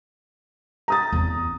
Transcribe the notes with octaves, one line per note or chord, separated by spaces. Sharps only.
A#5 D#6 A6
E2 C4